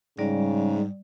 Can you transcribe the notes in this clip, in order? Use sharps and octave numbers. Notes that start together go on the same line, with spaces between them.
G#2 C#3 G3 D5